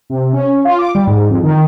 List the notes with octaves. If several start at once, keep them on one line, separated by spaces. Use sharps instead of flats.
C3
C#4
F4
D6
G3
G#2
F2
D#3